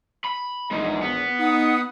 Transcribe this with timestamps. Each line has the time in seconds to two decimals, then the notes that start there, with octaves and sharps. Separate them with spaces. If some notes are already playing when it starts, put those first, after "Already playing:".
0.25 B5
0.71 A#1 E2 G#3 D#4
1.02 B3
1.40 D#4 F#5 D#6